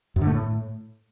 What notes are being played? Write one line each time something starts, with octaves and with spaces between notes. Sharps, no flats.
F#2
D3
A3
A2